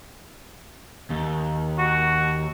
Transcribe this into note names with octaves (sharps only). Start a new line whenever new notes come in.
D#2
F#4